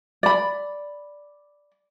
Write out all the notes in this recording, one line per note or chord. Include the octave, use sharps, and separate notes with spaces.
D5 B5